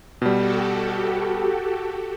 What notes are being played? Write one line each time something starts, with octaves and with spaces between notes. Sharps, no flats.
B2 G3 F#4 G4 A4